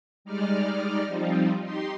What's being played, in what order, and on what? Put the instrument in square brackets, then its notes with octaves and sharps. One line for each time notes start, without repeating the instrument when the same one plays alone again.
[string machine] G3 G#3 D#4 D5 F6
F3 G3 C4 D#4 F4
D#4 G4 C6